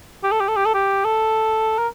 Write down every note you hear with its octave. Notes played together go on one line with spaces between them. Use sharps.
G4
A4
G4
A4
G4
A4
G4
A4
A#4